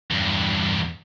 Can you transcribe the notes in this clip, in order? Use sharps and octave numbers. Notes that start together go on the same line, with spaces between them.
E2 G2